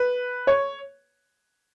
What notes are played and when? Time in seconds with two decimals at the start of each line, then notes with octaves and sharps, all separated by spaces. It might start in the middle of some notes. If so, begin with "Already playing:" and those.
Already playing: B4
0.47 C#5